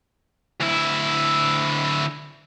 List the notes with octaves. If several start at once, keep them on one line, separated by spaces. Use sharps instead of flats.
D2 E4